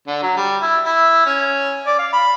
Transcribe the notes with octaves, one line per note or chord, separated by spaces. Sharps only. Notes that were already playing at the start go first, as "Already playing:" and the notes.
D3
F#3
G3
E4
E4
C#4
D5
F5
B5